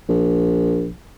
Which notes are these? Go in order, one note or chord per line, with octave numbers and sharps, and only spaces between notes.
A#1